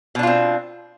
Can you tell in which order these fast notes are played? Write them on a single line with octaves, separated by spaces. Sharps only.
B2 D4 F4 C4